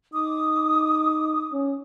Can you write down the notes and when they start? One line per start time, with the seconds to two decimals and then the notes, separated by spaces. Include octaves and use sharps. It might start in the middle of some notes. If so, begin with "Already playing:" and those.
0.13 D#4 D6 D#6
1.52 C#4